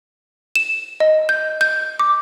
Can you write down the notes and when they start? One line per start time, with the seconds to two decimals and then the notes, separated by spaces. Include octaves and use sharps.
0.56 E7
1.00 D#5
1.29 G6
1.61 G6
1.99 D6